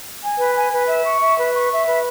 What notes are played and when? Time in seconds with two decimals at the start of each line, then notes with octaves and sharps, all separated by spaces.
0.22 G#5
0.39 B4
0.55 G#5
0.72 B4
0.88 E5
1.05 C#6
1.21 E5
1.37 B4
1.54 C#6
1.70 E5
1.87 B4